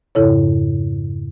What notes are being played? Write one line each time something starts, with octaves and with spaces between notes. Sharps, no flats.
F2 G#2 C#3 E4 A4 C#5